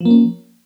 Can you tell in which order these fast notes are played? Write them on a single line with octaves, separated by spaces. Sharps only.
F3 A#3 C#4